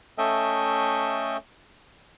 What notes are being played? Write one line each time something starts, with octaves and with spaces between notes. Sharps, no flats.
A3 C#4 A4 D#5 E5 G5